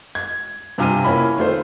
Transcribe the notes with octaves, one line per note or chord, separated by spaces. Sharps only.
G#6
G2 C3 F4 G#5 F6 D#7
A#3 C#4 E4 B5
D#3 A3 F4 C5